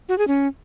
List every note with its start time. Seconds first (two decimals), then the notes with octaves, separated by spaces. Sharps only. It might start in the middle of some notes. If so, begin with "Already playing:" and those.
0.09 F#4
0.18 G#4
0.28 C#4